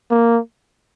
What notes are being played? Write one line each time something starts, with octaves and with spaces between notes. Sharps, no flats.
A#3